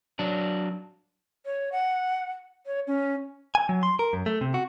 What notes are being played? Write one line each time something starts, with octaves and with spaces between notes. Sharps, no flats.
F#3 D4
C#5
F#5
C#5
C#4
G#5
F#3
C6
A#4
F#2
A3
C3
F#4